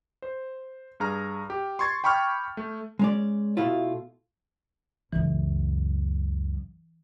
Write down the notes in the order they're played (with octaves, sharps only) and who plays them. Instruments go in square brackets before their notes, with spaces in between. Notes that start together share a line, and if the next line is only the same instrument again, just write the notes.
[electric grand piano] C5
G2 G#4 A#5 F6
G4
C6 C#6 G#6 A6
G5 B5 C#6 D6 F6 G6
A3
[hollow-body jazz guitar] G#3 C#4 D5
B2 A3 E4 F4
[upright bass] C#2 F#2 [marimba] E3